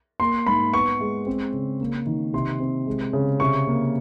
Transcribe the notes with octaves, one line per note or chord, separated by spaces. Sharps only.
A#3 C6
G#2 B5
B3 C#6
G#3
C4
C#3
A#3
D#3
C3 C6
C4
G#3
C#3
C3 C#6
A#3